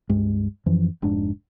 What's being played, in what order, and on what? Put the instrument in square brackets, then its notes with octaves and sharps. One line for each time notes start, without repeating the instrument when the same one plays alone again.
[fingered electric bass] C#2 G2 G#3
F#2 E3 F3
F1 G#2 D4